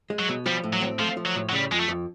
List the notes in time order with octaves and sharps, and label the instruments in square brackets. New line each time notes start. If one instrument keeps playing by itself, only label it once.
[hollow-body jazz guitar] G#3
[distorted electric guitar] F#3
[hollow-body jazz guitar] B2
[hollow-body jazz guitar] F3 [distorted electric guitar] G3
[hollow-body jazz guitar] A2
[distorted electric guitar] F#3
[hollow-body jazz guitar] C4
[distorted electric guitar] F3 [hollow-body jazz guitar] A3
[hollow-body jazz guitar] F3
[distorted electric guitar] F#3
[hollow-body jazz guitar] A2
[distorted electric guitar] F#3
[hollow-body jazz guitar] C#3 [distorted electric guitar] G3
[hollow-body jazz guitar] F2 [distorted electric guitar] G#3
[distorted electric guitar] A3
[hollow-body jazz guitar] F2